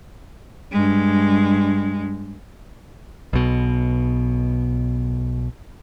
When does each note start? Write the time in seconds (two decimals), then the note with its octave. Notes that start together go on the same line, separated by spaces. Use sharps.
0.72 G2 G#3
3.33 B1 B2